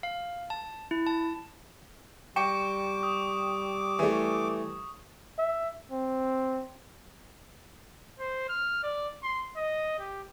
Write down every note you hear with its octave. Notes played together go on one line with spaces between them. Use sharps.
F5
A5
E4
A5
G3 G5 C#6 D6 C#7
D#6
E3 A3
E5
C4
C5
F6
D5
C6
D#5
G4